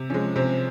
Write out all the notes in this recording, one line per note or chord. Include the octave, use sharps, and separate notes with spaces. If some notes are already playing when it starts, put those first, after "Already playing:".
Already playing: C3
F3 G#3 C#4
C3 C4